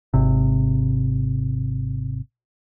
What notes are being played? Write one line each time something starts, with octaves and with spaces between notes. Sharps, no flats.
G#1 C3